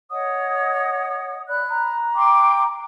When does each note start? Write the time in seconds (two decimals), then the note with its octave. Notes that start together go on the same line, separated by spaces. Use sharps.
0.10 C#5 D#5 F#5 D#6
1.48 D5 B5 F#6
1.70 A#5
2.14 G5 C6 D6